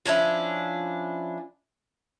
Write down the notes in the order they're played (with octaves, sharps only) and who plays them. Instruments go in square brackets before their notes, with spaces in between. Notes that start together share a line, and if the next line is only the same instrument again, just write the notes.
[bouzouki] F3 C#4 D4 E4